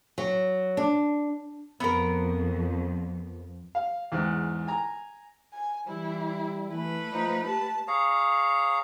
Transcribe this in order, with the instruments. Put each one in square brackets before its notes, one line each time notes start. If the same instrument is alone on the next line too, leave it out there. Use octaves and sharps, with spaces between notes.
[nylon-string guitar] F#3
D4
[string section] F2 [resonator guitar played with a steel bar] B3 A#4
[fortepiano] F5
E2 G#2 F#6
G#5 A#5
[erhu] G#5
[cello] E3 [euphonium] G3 [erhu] E4
[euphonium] E3 [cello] A3 B4
[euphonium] F3 [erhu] D#4
[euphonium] G4 [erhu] A5
[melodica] G#4 C#5 F5 A#5